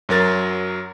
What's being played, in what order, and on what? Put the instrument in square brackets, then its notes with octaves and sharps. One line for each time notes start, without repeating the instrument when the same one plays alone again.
[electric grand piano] F#2 F#3 A#4 A6